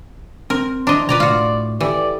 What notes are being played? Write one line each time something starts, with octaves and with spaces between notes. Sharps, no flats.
C4 A#4
E3 D4 C5 D#5 A#5
B2 F4 B4 D5 A#5
A2 F4 F#4 D5
E3 G4 A4 D5